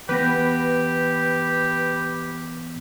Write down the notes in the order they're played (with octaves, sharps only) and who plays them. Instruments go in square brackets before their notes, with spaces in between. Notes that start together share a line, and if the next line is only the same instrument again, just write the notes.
[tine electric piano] E3 B3 A#6 [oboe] G4 [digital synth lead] B4